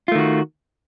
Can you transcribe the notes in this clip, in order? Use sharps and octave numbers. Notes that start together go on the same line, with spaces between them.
D#3 A3 F4 F#4